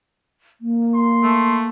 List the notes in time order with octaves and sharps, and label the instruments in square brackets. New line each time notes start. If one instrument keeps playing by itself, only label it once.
[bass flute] A#3
[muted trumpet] C6
[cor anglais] A3